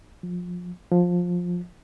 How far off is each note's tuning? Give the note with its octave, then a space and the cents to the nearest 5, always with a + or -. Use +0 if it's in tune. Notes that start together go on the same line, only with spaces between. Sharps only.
F3 +25
F3 +15